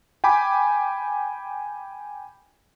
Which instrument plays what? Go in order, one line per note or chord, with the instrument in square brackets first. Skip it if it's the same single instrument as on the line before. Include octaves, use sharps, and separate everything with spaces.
[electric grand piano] G5 G#5 B5 D6